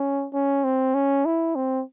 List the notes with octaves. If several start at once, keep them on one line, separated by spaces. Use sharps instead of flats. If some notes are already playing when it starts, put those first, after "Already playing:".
Already playing: C#4
C#4
C4
C#4
E4
C4